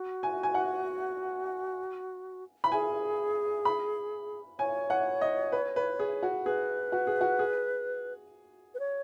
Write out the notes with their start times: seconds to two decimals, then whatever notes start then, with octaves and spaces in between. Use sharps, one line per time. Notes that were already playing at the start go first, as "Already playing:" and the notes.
Already playing: F#4
0.23 G#5
0.43 G#5
0.54 F#5
2.64 B5
2.72 G#4 G#5
3.65 B5
4.59 C#5 G#5
4.90 F#5
5.21 D#5
5.52 B4
5.76 B4
5.99 G#4
6.23 F#4
6.45 G#4 B4
6.92 F#4
7.07 G#4
7.21 F#4
7.39 G#4
8.74 B4
8.80 C#5